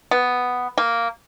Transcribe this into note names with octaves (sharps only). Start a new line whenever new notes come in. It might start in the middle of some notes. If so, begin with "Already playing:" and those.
B3
A#3